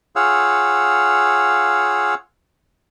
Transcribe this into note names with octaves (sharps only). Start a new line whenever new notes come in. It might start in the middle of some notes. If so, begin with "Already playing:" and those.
F4 G#4 C#5 F5 F#5 E6